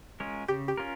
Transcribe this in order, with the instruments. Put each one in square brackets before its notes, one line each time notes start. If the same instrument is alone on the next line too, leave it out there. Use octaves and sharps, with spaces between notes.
[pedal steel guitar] G#3 C#4 F4 A#4
[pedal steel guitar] C#3 [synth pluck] G4
[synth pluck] G4
[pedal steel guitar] C#4 F4 A#4